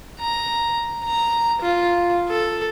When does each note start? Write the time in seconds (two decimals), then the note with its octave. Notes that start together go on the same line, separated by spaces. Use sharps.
0.19 A#5
1.04 A#5
1.62 F4
2.28 A4